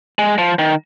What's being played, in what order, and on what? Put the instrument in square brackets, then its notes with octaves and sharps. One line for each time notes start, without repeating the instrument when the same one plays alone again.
[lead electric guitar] G#3
F3
D#3